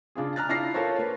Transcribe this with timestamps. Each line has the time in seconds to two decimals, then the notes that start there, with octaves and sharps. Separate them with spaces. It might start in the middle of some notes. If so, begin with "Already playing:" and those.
0.15 C#3 D4 F4 G#4
0.36 A#5 F6 F#6 A6
0.49 D4 E4 F4 F6 A#6 C7
0.74 F4 A4 A#4 C5 C#5
0.98 A#3 B4